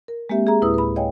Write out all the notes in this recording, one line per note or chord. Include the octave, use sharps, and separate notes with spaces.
A#4
G#3 A#3 C4 G4 E5
G#4 E5 A#5
D2 A2 E4 B4 D#6 E6
B4 B5
C#5 D#5 F5 G5 G#5